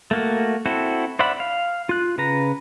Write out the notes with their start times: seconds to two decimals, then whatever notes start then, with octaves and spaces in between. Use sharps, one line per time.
0.11 A3 A#3 F#4
0.66 C4 E4 F#4 A4
1.19 C5 D5 E5 F#5 B5
1.40 F5
1.89 F4 F#6
2.18 C#3 B4 A#5